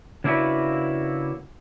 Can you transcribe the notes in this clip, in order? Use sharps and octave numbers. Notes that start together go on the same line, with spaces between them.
C#3 A#3 D4 E4 F#4 B4